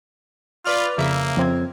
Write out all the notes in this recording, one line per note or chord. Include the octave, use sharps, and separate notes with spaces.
F4 B4 D5 F6
F2 C#3 A#3 E5
F2 C4 G#6